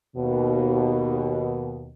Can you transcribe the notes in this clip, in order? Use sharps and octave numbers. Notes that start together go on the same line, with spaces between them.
D#2 B2